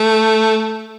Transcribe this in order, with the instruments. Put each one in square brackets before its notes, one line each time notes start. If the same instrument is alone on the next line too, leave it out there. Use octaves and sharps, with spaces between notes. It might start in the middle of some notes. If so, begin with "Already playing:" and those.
Already playing: [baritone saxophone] A3